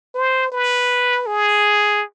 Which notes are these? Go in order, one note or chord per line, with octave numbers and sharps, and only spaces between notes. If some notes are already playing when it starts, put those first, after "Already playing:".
C5
B4
G#4